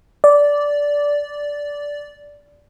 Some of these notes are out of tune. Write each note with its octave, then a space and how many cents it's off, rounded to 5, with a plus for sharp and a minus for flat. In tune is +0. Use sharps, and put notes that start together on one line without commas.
D5 -10